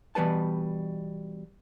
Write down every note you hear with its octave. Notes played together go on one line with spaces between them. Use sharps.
B2 E3 G3 B4 A5